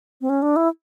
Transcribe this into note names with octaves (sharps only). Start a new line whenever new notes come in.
C4
C#4
D4
E4